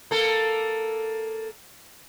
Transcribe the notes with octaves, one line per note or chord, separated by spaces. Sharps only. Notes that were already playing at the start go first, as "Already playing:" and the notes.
A#3 A4